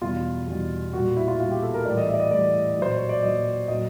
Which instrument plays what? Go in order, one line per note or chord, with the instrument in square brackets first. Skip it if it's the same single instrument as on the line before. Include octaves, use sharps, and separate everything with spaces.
[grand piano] E2 B2 G3 F4
E2 B2 G3
A#2 F#4
G3
E4
F4
A#2 G3 F4
G4
A4
A#4
A2 E3 G3 D5
D#5
E5
D5
D#5
A2 E3 G3 D5
A#2 F#3 C5
C#5
D5
A#2 F#3 D#5
A#2 F#3 D#5